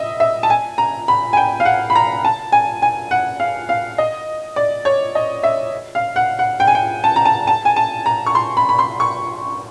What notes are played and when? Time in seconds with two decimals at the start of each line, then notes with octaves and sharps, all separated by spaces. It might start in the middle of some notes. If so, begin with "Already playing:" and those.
Already playing: D#5 E5
0.20 E5
0.43 A5
0.50 G#5
0.78 A#5
1.08 B5
1.33 G#5
1.37 G5
1.60 F5
1.65 F#5
1.90 B5
1.95 A#5
2.25 A5
2.52 G#5
2.82 G#5
3.11 F#5
3.40 F5
3.69 F5
3.98 D#5
4.56 D5
4.85 C#5
5.15 D#5
5.43 E5
5.95 F5
6.16 F#5
6.39 F#5
6.60 G5
6.67 G#5
6.75 G5
7.04 A5
7.16 A#5
7.25 A5
7.47 A5
7.65 G#5
7.76 A5
8.06 A#5
8.26 C#6
8.35 C6
8.57 B5
8.69 B5
8.79 C6
9.00 C#6